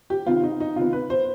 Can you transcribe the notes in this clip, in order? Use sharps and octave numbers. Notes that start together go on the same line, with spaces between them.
G4
C3 D#3 B3 F4
D#4
D#4
C3 D#3 B3 F4
B4
C5